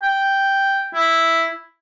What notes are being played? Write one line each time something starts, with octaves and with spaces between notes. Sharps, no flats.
G5
E4